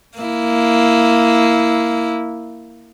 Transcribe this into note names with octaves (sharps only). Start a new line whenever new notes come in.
A#3 E4